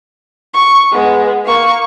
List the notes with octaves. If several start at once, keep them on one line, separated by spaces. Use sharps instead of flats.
C#6
G#3 B3
A#3 C#6